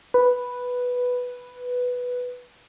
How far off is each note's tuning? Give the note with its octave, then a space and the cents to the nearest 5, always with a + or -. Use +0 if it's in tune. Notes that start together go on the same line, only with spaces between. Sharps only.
B4 +0